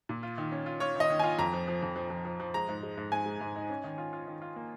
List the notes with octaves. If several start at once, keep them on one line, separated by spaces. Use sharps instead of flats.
A#2
F4
D#3
C#4
F4
F4 C#5
D#3 D#5
D#3
F4 G#5
F2 A#5
F3
F3
F2
F3
F3
F3
F3
G#3 A#5
G#2
G#3
G#2
G#2 G#5
G#3
G#2
D#4
C#4
D#3
F4
F4
D#3
F4
A#3